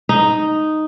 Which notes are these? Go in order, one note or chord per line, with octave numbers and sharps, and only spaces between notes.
D#4